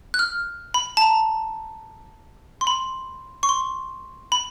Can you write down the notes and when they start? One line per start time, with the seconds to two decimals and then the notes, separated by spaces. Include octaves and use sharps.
0.14 F#6
0.19 F6
0.74 B5
0.97 A5
1.02 A#5
2.61 C6
2.67 B5
3.43 C#6
3.49 C6
4.32 B5